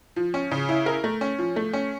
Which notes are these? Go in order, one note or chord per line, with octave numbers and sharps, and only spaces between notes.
F3
C#4
C#3
E4
A#4
A3
C#4
F3
A3
C#4